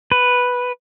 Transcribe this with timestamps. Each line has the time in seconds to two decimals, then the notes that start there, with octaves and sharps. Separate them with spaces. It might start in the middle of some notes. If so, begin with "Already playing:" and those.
0.12 B4